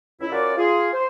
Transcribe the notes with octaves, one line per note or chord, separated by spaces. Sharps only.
C#2 E4
C#4 F4 F#4 A#4 D5
F4 G#4
C5